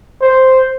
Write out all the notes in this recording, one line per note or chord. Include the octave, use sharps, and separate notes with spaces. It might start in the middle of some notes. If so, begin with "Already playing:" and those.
C5